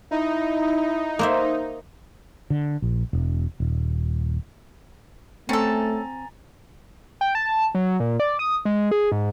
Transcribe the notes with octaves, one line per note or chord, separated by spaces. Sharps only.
D#4 E4
A#3 C5 E5
D3
A#1
E1
D#1
A3 C4 C#4 A4 G#5 A#5 A6
G5
A5
F#3
A#2
D5
D#6
G#3
G#4
G#2